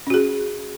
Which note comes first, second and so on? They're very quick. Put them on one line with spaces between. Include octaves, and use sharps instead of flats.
C#4 F#4 G#4